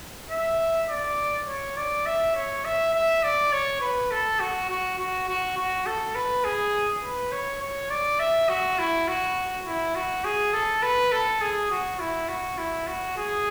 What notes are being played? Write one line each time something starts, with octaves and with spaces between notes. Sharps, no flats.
E5
D5
C#5
D5
E5
C#5
E5
E5
D5
C#5
B4
A4
F#4
F#4
F#4
F#4
F#4
A4
B4
G#4
B4
C#5
C#5
D5
E5
F#4
E4
F#4
E4
F#4
G#4
A4
B4
A4
G#4
F#4
E4
F#4
E4
F#4
G#4